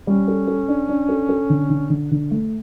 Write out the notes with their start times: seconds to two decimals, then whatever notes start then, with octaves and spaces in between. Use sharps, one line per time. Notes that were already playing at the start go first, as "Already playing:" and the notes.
0.07 G3 C#4
0.28 A4
0.47 A4
0.68 D4
0.89 D4
1.09 A4
1.29 A4
1.50 D3
1.70 D3
1.90 D3
2.11 D3
2.31 A3